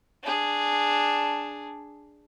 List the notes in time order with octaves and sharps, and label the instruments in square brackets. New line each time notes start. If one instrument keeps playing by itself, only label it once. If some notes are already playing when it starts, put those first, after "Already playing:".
[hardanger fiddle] D4 G#4